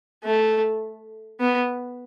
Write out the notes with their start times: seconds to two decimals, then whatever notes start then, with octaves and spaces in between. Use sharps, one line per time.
0.24 A3
1.40 B3